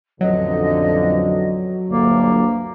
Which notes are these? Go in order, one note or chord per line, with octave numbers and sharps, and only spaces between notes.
A1 F2 D3 F#3 D#5
G1 D2 A#3 D5